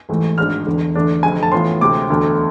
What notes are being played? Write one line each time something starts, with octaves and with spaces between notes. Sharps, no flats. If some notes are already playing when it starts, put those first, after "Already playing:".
A1 G#2 E3 A3
G#1 G#2 G#3 D4 F6
E1 E2 D3
E2 D3 A3 D4
F1 F2 D3 A3 G#5
A5
A2 E3 B3 F4 C6
D2 C3 G#3 D6
E1 D2 D3 A3